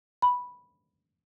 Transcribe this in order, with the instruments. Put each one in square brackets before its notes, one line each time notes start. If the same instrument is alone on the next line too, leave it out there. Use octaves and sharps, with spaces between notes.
[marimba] B5